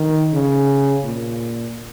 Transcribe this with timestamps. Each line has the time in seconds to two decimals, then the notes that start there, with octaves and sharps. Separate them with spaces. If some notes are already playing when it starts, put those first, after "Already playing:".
Already playing: D#3
0.34 C#3
1.04 A#2